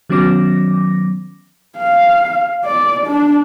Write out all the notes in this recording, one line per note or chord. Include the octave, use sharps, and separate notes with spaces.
D#3 F#3 B3 C#4 D6 A#6
F5
D5
D4